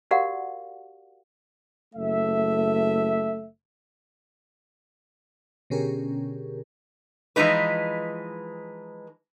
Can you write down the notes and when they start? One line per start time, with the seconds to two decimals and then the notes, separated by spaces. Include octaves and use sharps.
0.11 F#4 G4 A#4 D5 F5 F#5
1.95 F#1 A3 E5
5.70 B2 D3 C#4 G4 G#4 A#4
7.36 E3 F3 G#3 D#4 B4